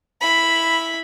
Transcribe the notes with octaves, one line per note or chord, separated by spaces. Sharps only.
E4 B5